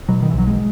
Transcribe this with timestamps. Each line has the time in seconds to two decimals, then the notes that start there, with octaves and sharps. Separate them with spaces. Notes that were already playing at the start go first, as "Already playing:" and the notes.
0.09 B2 F#3
0.22 D#3
0.31 E3
0.34 B1 F#3
0.47 G#3